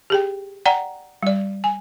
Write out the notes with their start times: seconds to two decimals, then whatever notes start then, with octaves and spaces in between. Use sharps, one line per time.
0.10 G4 G#4 G5
0.65 D5 F#5 G5 A#5
1.23 G3 D5
1.64 G#5